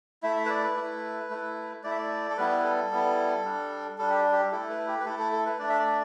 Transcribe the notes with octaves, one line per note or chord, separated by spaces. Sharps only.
A3 E4 E5
E5
B4
D5
B4
A3 E4
A3 E4
A3 E4 D5
E5
D5
A4
G3 B3 E4 B4
A4
G3 B3 E4
G3 D4
G3 D4 A4
G4
G4
A3 E4 A4
B4
G4
B4
A3 E4 A4
A4
A4
B4
A3 D4 D5
E5
D5